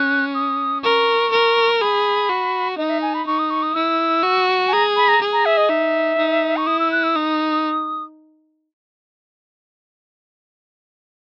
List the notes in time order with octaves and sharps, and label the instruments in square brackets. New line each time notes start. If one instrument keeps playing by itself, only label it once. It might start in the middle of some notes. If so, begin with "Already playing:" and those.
Already playing: [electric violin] C#4 [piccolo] F#6
[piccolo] D#6
[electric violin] A#4 [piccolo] C#6
[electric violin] A#4
[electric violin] G#4 [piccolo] B5
[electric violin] F#4
[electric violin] D#4 [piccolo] D#5
[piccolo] E5
G#5
B5
[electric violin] D#4 [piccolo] C#6
[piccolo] D#6
C#6
D#6
[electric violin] E4 [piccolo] E6
[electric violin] F#4
[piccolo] G#5
[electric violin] G#4 [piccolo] A#5
[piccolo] B5
A#5
[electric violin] G#4
[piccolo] A#5
E5
D#5
[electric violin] D#4 [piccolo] E5
[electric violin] D#4
[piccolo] C#6
[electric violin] E4 [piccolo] D#6
[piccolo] E6
F#6
E6
[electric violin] D#4 [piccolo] D#6